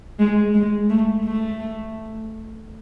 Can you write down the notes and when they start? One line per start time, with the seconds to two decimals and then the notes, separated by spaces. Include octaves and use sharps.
0.19 G#3
0.54 G#3
0.90 A3
1.24 A3